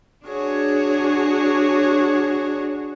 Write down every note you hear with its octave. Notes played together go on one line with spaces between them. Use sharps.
D4 F#4 G#4 C#5